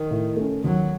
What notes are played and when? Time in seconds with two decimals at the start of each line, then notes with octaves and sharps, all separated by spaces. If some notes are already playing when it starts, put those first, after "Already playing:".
Already playing: D#3
0.11 A2
0.37 A3 C#4
0.63 D#2 F#3